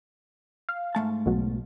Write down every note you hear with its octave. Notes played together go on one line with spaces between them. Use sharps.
F5
G#2 A3 A5
B1 B2 F#3